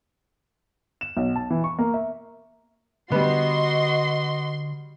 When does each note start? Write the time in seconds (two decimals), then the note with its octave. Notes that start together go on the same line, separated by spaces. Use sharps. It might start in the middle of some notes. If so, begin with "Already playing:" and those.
1.01 E7
1.17 B1
1.36 A5
1.50 E3
1.64 C#6
1.79 A#3
1.94 E5
3.12 D3 G3 B3 F#4 D#5 C6